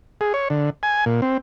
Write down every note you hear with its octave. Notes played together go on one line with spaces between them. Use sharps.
G#4
C#5
D3
G#5
A#2
C4